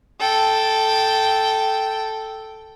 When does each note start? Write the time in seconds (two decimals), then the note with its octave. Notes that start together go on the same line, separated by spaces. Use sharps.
0.20 A4 G5